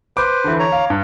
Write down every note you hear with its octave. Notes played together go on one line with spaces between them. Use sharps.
B4 C5 D6
D3 E3
C#5 A#5
F5
G2